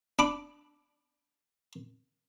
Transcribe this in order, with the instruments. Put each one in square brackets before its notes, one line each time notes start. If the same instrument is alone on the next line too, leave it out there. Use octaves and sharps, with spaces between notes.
[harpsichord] D4 B5 D6